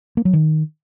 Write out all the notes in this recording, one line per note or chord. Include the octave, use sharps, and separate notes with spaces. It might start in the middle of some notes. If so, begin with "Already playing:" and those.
A#3
F#3
D#3